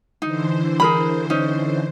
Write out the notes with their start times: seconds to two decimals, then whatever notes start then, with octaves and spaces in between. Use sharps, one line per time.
0.22 D3 E3 D#4 C5
0.80 G#4 A#4 B5
1.30 C#4 D#4